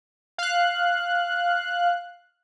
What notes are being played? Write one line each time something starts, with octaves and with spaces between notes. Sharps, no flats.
F5 F#6